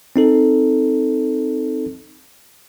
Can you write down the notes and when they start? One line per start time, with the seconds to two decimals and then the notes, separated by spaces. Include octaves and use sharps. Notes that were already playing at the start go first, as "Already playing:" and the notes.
0.16 C4 D#4 A4